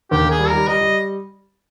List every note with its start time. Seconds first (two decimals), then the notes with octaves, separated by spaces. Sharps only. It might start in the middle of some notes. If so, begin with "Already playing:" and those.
0.11 D#2 G4
0.25 D#3
0.30 G#4
0.39 G3
0.48 A#4
0.53 G3
0.67 G3 D#5
0.81 G3